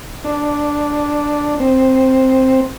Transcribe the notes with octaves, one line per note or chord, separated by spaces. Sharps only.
D4
C4